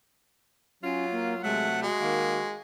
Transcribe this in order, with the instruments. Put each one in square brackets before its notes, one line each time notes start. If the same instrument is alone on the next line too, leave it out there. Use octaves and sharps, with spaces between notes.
[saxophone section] F#3 F4 [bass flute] C#4
[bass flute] A#3
[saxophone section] C3 F#3 A3 [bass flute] G#3 [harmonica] F#5
[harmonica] G#3 [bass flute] F#4
[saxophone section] D#3 A#3